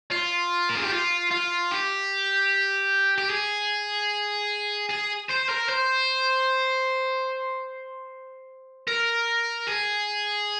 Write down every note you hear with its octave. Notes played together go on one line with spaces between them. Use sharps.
F4
A#4
G#4
G4
F4
F4
G4
G4
G#4
G#4
C5
A#4
C5
A#4
G#4